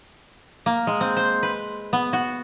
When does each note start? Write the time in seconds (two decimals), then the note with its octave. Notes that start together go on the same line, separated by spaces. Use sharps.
0.66 A#3
0.87 G#3
1.01 C4
1.17 C5
1.43 B4
1.93 B3
2.13 F#4